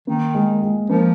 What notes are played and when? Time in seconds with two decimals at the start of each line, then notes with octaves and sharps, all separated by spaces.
0.07 D#3 A#3
0.35 G#3
0.63 G#3
0.89 F3 A#3